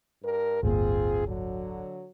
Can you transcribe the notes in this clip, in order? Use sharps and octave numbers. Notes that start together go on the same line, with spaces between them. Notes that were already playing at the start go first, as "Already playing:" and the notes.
G2 A#4
D1 G1 A#3 C4 F4 G#4
D3 F#3